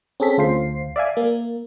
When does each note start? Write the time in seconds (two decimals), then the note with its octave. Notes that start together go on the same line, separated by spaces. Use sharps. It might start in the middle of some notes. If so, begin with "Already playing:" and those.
0.20 C4 C#4 G#4 A4 B6
0.38 D2 F4 C5 C7
0.96 D5 E5 F5 G#5
1.17 A#3